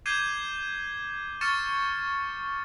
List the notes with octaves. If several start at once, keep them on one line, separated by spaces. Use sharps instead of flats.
D6 G6 G#6 C7 D#7 G7
C#6 F6 A6 C#7 E7